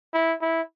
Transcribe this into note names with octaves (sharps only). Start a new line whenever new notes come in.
E4
E4